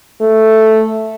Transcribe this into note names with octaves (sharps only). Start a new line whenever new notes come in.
A3